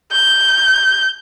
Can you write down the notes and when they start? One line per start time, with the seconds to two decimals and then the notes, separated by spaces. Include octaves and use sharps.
0.12 G6